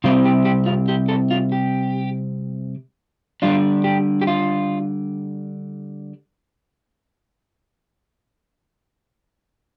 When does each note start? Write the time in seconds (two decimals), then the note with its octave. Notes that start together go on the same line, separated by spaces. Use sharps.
0.04 C3 G3 C4 F4
0.25 G4
0.45 G4
0.66 F4
0.88 G4
1.09 A4
1.31 F4
1.52 G4
3.42 D3 G3 D4 F4
3.84 G4
4.21 G4
4.27 F4